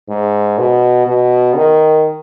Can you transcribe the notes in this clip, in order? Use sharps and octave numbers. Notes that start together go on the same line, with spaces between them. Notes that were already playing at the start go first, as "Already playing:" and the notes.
G#2
B2
B2
D#3